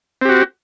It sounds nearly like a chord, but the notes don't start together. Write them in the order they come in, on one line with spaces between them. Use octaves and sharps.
C4 G4 F#4